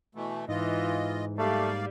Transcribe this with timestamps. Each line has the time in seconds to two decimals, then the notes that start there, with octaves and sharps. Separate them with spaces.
0.15 B2 E3 A3
0.49 G#2 E3 F4 D#5
1.38 G3 A3 A#3 D5 F5